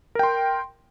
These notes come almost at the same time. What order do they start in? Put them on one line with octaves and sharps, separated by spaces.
A#4 G5 C6